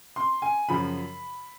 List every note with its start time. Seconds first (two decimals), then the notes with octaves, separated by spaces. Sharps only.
0.16 C6
0.42 G#5
0.69 F#2 C#3 F3 B5